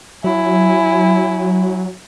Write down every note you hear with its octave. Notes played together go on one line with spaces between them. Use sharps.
F#3 E4 G#5